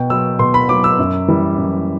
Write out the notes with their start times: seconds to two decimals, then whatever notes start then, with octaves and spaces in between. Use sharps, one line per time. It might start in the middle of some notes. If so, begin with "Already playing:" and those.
Already playing: B2 G5
0.10 F#3 E6
0.39 B2 C6
0.54 B5
0.69 F#3 D6
0.84 E6
0.99 F#2
1.28 E3 G3
1.58 F#2